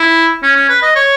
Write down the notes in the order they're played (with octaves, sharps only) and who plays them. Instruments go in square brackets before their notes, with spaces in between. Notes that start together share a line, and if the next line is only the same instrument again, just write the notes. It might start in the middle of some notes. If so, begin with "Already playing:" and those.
Already playing: [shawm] E4
C#4
C#4
B4
D#5
C#5